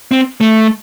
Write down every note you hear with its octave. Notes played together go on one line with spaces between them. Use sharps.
C4
A3